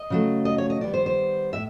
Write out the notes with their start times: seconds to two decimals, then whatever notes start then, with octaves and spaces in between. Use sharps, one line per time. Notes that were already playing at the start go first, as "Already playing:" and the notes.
Already playing: D#5
0.10 C#3 F#3 A3
0.45 D#5
0.58 C#5
0.70 D#5
0.81 D#3 G3 B3 D5
0.94 C5
1.06 C5
1.53 A2 E5